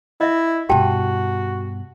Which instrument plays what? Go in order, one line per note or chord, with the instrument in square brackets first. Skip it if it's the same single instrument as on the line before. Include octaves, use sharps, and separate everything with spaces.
[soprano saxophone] E4 [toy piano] D#5 E5
[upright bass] G2 B2 [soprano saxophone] F#4 [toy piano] G4 G5 A5